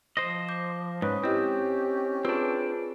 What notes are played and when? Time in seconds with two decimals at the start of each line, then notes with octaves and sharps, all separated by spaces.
0.17 F3 C5 D#5
0.49 D6 G6
1.02 G#2 C#4 B4 D#6
1.24 C4 E4 G4 D#5
2.25 C4 D4 F4 G#4 B4